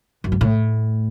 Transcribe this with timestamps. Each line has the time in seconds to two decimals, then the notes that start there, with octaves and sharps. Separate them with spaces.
0.24 F#2
0.32 G#2
0.41 A2